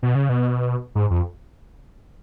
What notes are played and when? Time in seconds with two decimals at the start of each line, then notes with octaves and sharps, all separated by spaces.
0.03 B2
0.15 C#3
0.29 B2
0.95 G#2
1.11 F2